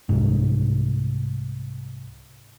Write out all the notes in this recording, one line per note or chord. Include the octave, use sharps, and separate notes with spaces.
C2 G#2